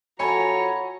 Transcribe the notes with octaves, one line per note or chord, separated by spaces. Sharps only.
F2 F3 F#4 A4 C#5 G#5 A#5 B5